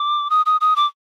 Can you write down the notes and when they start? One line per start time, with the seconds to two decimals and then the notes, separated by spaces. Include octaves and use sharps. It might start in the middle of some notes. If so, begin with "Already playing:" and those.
Already playing: D6
0.30 D#6
0.46 D#6
0.61 D#6
0.76 D6